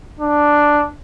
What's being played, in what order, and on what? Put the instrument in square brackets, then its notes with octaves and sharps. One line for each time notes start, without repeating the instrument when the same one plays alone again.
[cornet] D4